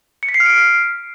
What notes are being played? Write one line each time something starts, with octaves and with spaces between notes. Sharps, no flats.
C#7
B6
C7
F6
D7